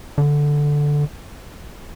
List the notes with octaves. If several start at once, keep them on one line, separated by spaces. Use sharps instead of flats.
D3